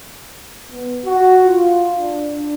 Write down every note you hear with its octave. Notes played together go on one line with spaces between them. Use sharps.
B3
F#4
F4
D4